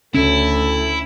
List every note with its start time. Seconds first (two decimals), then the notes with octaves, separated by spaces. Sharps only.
0.14 D2 C#4 E4 A4